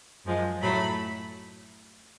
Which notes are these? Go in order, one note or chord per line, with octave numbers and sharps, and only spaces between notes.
F#2 F3 G#3
A2 F#3 A3 B5